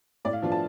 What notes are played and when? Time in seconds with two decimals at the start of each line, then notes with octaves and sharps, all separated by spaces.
0.25 A2 D5
0.33 F5
0.42 F3 B3 D4 F4
0.52 A5